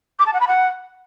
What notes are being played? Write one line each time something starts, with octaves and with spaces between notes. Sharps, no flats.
D6
A5
F#5
B5
F#5